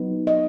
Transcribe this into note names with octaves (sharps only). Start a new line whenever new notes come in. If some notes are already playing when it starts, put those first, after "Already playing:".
Already playing: F#3 B3 D#4
D#5